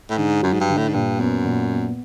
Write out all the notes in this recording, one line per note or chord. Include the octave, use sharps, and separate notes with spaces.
A2
G#2 D3
F#2 F#3
G#2
G2
D3
A2
G#2
G2 A#2
F#2 B3
A#2
B3